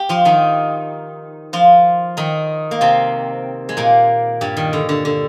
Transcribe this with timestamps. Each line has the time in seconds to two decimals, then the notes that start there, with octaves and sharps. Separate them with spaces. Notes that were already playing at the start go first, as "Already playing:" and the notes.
Already playing: G4
0.09 F3 F4
0.25 D#3 D#4
1.53 F3 F4
2.17 D#3 D#4
2.71 A#3
2.81 C3 C4
3.69 G#3
3.77 A#2 A#3
4.41 G2 G3
4.57 D#3
4.73 D3
4.89 D3
5.05 D3